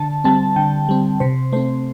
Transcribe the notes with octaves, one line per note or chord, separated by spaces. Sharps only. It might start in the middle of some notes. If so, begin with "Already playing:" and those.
Already playing: D3 A5
G3 C4 A5
D3 G5
G3 C4
C3 C5
A3 C4 C5